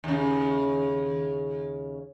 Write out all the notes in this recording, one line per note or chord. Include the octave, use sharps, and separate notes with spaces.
D#2 C#3